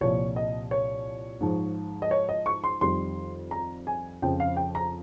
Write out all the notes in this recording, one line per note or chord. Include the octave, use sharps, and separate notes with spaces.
C2 A#2 F3 C#5
D#5
C#5
G#2 F3
D#5
C#5
D#5
C#6
C6
F2 D#3 G3 C6
A#5
G#5
F2 C#3 F3 G5
F5
G5
A#5